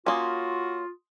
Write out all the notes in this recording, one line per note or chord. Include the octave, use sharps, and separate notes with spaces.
A#3 C#4 F4 F#4 C6 D#6